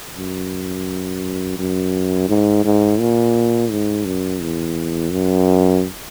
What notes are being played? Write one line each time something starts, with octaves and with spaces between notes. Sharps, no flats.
F#2
F#2
G#2
G#2
A#2
G#2
F#2
E2
F#2